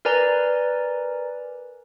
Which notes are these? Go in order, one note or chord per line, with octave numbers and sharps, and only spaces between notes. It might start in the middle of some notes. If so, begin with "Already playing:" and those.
A#4 B4 D5 G#5 A#5